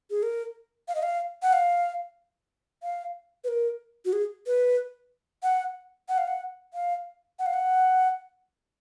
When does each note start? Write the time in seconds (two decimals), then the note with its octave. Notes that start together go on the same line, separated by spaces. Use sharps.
0.10 G#4
0.23 A#4
0.88 F5
0.95 D#5
1.03 F5
1.42 F#5
1.53 F5
2.83 F5
3.44 B4
3.48 A#4
4.05 F#4
4.13 G#4
4.46 B4
5.43 F#5
6.09 F#5
6.18 F5
6.28 F#5
6.74 F5
7.39 F#5
7.46 F5
7.53 F#5